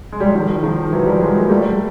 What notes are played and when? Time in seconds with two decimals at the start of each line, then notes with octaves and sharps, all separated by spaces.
0.12 G#3
0.20 G3
0.27 F#3
0.34 D#3 F3
0.63 D#3 F3
0.93 E3 F#3
1.06 F3 G3
1.20 F#3 G#3
1.39 A#3
1.50 G3 A3